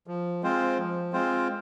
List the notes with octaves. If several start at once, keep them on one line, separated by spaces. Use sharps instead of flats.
F3
G#3 C4 F4 C5
F3
G#3 C4 F4 C5